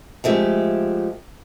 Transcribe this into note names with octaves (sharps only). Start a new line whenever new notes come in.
F3 G#3 A3 G4